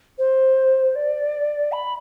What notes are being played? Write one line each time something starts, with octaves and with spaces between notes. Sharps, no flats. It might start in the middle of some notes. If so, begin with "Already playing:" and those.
C5
D5
B5